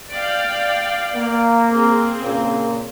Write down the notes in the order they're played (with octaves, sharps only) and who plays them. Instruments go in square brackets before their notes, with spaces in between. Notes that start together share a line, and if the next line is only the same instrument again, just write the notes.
[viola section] D5 F5 G5
[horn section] A#3
[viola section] C4 G#4
[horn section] A#2 C#3 A#3